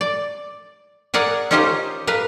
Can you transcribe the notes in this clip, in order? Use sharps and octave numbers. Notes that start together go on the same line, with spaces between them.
D5
G#4 A#4 D5 F#5
C#4 D#4 F4 G4 C5 D#5
A#4 B4 F5